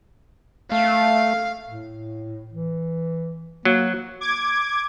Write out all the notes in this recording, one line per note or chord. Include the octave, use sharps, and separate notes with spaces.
A3 F5
A2
E3
F#3 A#3
D6 G#6